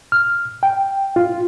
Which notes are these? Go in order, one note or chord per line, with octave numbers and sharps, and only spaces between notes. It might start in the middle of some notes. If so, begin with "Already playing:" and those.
F6
G5
F4